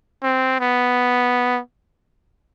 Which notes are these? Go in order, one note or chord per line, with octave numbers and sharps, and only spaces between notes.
C4
B3